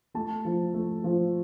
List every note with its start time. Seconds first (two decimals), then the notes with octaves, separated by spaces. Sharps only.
0.14 A3 A5
0.45 F3
0.74 A3
1.04 F3